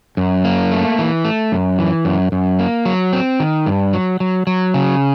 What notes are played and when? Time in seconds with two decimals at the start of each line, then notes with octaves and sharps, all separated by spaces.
0.17 F#2
0.44 A#3
0.72 A3
0.98 E3
1.25 A3
1.52 F#2
1.79 E3
2.05 F#2
2.32 F#2
2.59 A#3
2.85 F#3
3.13 C4
3.40 D#3
3.66 G2
3.93 F#3
4.20 F#3
4.47 F#3
4.74 C#3